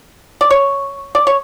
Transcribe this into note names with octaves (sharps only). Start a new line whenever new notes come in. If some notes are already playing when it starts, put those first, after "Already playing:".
D5
C#5
D5
C#5